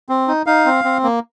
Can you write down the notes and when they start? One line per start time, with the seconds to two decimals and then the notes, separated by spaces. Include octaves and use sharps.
0.09 C4
0.28 D#4
0.46 D#4 F5
0.66 C4
0.84 C4
1.03 A#3